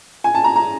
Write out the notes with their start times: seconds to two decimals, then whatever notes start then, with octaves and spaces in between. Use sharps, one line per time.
0.24 G#5
0.35 A5
0.44 A#5
0.56 A#5